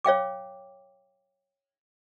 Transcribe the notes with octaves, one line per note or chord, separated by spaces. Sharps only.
C#5 F5 G5 D6